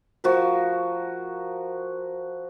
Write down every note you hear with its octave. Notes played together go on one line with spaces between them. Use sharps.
F3 F#4 A#4